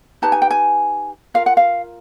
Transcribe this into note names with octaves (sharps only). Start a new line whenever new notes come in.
D#4 G4 B4 A5
G#5
G5
G#5
F4 A#4 F5
F#5
F5